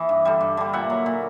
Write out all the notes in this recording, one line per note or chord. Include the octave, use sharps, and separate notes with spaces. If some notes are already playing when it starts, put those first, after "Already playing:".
Already playing: E3 D#5
G2
D3 G3
G2
D3 G3
A#2 E5 F#5
F#3
A#2